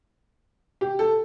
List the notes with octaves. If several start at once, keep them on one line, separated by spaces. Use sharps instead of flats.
G4
A4